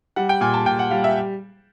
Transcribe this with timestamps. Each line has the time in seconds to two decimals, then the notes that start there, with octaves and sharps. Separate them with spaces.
0.16 G3 F#5
0.29 G5
0.41 A#2 G#5
0.54 A5
0.66 A#2 G5
0.79 F#5
0.91 G3 F5
1.04 E5